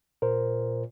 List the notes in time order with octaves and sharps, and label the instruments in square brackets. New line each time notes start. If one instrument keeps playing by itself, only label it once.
[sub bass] A#2 [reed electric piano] A#4 C5